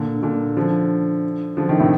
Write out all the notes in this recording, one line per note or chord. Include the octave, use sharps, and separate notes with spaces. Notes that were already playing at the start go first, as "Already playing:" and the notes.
Already playing: A#2 D3
A#2 D3
D3 F3
D3 F3
C3 D#3
A2 C3